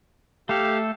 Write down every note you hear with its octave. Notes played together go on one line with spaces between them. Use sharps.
A3 G4 A4 F5